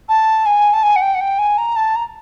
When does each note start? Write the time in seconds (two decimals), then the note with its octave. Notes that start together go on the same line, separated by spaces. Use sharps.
0.09 A5
0.46 G#5
0.73 A5
0.83 G#5
0.96 F#5
1.01 G5
1.14 F#5
1.21 G5
1.39 G#5
1.58 A#5
1.76 A5
1.96 A#5